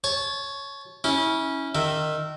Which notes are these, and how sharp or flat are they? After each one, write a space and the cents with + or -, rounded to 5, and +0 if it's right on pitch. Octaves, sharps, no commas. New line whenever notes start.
C#5 +0 A5 -25
C#4 +0 E4 -30
D#3 -20 E5 +0